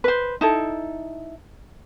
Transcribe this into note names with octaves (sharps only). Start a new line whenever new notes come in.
B4 C5
D#4 E4 A4